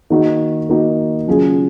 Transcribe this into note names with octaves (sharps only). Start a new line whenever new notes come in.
D#3 A#3 D#4 F#4
D#3 A#3 D#4 F#4
C#3 F#3 C#4 F4 G#4